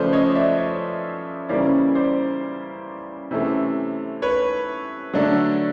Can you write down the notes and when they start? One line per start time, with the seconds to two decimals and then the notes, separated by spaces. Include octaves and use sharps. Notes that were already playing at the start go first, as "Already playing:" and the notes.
Already playing: C#3 F3 A3 C#4 B4 C5 D5
0.13 C#5 D#5
0.35 D5 E5
0.58 C#5 D#5
1.49 C#3 E3 G3 A#3 C#4 C5 D5
1.95 C5 D5
3.31 C3 E3 A3 C#4
4.22 B4 C#5
5.14 D3 F#3 A3 D4